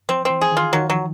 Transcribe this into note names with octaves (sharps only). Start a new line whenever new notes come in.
F3 C4
E3 C4
G#4
D#3
F4
D#3 F#3
F3 F#3